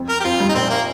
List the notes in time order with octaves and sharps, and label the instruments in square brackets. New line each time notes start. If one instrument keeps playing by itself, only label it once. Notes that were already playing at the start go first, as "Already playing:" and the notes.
Already playing: [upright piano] F2
[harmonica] A#4
G4
[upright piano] F2 [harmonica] F4
[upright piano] G2
[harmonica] D#4
[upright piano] A#1 A#2 [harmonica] C4
[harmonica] A#3